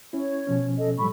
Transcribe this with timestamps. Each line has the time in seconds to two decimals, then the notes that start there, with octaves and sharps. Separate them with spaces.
0.13 C#4 E4 C#5
0.47 B2 F3 C#4
0.78 A4 D#5
0.98 A2 F3 G3 A4 B5 C#6